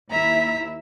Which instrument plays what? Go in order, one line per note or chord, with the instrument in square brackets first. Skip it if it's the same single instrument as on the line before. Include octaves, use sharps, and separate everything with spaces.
[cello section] D#2 E4 E5 [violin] A#5 B6